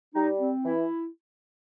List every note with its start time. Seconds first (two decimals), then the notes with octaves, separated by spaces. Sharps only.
0.15 G3 D#4
0.40 C4
0.64 E3 E4